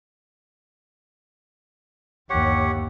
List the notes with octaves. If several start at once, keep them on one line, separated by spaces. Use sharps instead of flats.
G1 D#2 G4 C#5 F#5